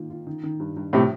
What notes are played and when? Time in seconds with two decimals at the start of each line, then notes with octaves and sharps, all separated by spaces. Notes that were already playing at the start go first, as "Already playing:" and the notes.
Already playing: D#3 A#3 F4
0.10 F4
0.27 D#3
0.43 D#3
0.60 G2
0.77 G2
0.93 A2 C3 F3